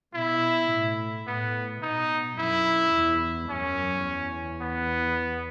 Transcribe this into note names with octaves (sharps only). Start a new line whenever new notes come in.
B2 E4
A2
A2 B3
B2 D#4
F#2 E4
E2
F#2 C#4
E2
B3